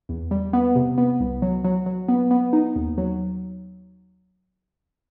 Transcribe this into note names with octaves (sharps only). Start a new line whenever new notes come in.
E2
G3
B3
C3
B3
C2
F#3
F#3
F#3
B3
B3
D#4
D#2
F#3